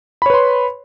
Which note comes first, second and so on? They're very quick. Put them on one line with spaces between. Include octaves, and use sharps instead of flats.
B5 C#5 B4 C6